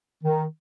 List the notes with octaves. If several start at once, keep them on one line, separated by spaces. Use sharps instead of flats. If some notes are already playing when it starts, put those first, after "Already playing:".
D#3